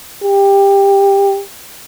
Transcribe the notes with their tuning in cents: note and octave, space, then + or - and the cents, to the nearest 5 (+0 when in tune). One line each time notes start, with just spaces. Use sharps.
G4 +15